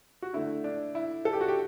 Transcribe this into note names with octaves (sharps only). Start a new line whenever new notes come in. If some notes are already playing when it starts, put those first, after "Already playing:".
F#4
D3 A3 E4
D4
E4
A4
G4
F#4
G4